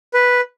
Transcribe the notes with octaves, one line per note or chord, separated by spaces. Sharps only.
B4